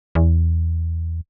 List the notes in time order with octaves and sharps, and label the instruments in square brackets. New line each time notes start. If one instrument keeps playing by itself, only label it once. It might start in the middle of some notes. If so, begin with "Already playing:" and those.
[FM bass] E2